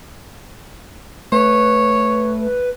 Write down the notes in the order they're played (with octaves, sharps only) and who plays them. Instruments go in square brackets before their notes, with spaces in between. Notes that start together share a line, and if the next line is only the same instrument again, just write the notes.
[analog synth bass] A3 [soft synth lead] B4 [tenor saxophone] C#5